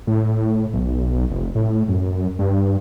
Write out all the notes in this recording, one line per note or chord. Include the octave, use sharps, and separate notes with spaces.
A2
B1
F1
A2
F#2
G2